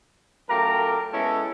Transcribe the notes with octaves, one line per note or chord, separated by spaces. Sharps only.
F#2 A3 F4 G4 A#4 A#5
G#3 B3 C#4 E4 A4